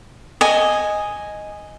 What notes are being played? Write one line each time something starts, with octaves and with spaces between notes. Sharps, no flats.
D#5 G#5